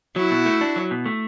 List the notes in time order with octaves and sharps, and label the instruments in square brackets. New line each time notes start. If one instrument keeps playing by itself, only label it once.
[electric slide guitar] F#3 [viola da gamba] E4 F#4
[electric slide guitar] B2
A3
D4
F#3
B2
A3